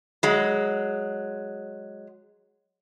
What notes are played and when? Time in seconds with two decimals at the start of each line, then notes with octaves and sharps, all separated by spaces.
0.23 F#3 G#3